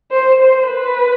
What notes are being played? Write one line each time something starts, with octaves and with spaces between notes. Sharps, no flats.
C5
C5
B4